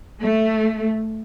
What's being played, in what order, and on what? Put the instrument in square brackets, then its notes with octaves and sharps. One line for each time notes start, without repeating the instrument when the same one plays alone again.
[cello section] A3